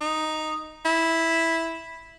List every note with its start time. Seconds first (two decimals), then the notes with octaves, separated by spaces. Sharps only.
0.01 D#4
0.85 E4